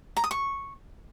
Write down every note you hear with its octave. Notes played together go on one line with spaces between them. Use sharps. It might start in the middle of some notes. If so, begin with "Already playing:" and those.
A#5
D#6
C#6